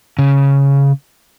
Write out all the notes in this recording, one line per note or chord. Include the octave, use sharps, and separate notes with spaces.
C#3